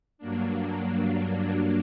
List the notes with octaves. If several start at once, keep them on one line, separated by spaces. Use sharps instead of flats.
G2 F#3 A#3 D4